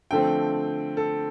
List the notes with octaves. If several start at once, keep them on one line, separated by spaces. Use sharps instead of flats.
D3 F3 A3 C4 G5
A4